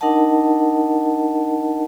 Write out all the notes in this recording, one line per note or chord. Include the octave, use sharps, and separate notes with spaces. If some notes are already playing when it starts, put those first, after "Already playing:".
D4 D#4 A#4 D#5 F#5 A5